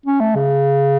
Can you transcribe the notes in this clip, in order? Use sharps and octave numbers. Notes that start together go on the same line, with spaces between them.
C#4
A3
C#3